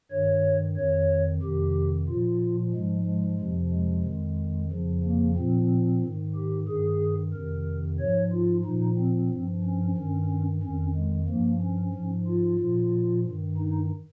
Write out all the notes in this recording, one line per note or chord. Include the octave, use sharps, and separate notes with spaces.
G2 D#3 C#5
F2 D#3 C#5
F2 C3 D#3 G4
A#2 F3 F4
G#2 F3 G#3
G#3
F2 C3 F3
G#3
F2 D#3
F2 C#3 F3
A#3
A#2 F3 C4
G#2 D#3
G4
G2 D#3 G#4
F2 C3 D#3 A#4
G#2 F3 C#5
F4
A#2 F3 D#4
C4
G2 F3
C#4
G2 D#3 C#4
F2 D#3 C#4
G#3
G2 F3 A#3
C#4
G#2 F3
F4
A#2 F3
G2 D#3
D#4